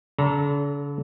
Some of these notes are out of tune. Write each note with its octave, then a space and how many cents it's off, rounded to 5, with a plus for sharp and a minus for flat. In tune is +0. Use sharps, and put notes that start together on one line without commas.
D3 -45 A4 +0 A#5 +15